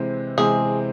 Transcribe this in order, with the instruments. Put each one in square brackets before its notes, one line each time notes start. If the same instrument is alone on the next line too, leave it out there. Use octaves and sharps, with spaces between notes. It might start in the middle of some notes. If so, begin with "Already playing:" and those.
Already playing: [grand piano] C3 E3 G#3 C4 [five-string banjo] C5
[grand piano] C3 E3 G#3 C4 [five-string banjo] G#4